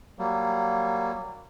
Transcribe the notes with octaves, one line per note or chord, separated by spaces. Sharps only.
F#3 G3 A#3